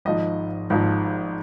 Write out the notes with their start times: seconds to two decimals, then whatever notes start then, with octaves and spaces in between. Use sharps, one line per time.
0.05 G#1 G#2 F3 D#5
0.70 G#1 G#2 F3